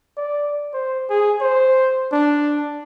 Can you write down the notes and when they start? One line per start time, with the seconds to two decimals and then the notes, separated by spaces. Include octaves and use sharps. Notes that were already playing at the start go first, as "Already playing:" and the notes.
0.17 D5
0.74 C5
1.10 G#4
1.41 C5
2.12 D4